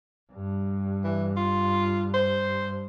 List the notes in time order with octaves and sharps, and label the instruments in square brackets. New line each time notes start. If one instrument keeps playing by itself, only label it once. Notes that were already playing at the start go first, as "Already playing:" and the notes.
[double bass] G2
[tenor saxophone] E3
F4
C5